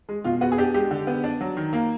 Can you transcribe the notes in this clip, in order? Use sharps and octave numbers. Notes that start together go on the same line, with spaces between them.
G#3
B2 F4
B3 F#4
G#4
D4 G4
G#3 G4
D3
B3
D4
F#3
D#3
A#3